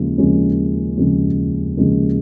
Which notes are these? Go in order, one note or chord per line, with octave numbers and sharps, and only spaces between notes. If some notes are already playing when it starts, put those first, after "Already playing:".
Already playing: D#2 C#3 F3 G#3
D#2 C#3 F3 G#3 C#4
D#2 C#3 F3 G#3 C#4
D#2 C#3 F3 G#3 C#4